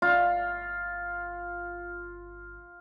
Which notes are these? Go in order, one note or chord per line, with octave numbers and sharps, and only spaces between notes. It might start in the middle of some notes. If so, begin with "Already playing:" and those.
G1 F4